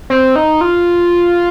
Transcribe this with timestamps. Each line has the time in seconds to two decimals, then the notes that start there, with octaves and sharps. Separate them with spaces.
0.10 C4
0.36 D#4
0.61 F4